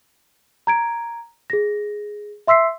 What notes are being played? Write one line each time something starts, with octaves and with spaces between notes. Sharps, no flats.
A#5 G#6 D7
G#4 A#6
E5 C6 E6 B6 C7